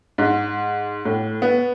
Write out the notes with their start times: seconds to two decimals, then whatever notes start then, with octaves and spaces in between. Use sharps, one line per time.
0.18 G#2
1.05 A2
1.42 B3